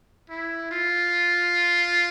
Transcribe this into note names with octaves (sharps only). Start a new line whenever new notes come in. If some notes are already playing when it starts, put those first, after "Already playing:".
E4
F4